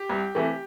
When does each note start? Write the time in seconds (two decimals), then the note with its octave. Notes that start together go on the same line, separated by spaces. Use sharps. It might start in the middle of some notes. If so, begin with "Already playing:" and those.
Already playing: G4
0.09 C2
0.35 C3 E3 A3